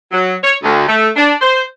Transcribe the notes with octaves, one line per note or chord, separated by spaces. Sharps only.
F#3
C#5
D2
A3
D4
C5